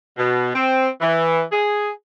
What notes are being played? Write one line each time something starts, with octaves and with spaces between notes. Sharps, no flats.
B2
C4
E3
G#4